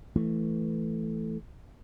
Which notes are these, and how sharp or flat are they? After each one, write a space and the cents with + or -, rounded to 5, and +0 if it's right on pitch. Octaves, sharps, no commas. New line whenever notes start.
E3 +0 A3 +0